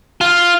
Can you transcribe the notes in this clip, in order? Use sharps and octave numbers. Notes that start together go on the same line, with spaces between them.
F4